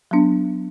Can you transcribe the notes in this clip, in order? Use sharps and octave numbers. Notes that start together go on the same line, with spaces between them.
F#3 B3 D4